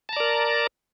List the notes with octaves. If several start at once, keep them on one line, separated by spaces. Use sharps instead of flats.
A#4 D5 A5 A#5